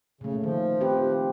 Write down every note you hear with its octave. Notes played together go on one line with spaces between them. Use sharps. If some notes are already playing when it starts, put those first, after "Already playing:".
A#2 C#3 A3
D#3 F3
C4 G4 B4